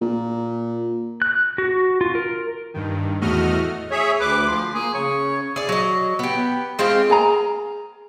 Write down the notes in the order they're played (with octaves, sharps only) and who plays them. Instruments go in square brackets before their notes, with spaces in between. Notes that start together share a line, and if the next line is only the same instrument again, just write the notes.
[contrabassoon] A#2
[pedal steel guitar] F#6
F#4
F4
A#4
[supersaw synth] G2 D#3
E2 A2 A3 F#4 D#5 F6
[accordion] G#4 C#5 E5
[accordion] D2 D6 [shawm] B4
[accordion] F3 [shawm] C6
[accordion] A#3 [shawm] G#4
[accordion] C#3 [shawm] C#5
[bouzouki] G#4 D5
F#3 D#5
B3 G4
G#3 C4 F4 G4
[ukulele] G#4 G#5 A#5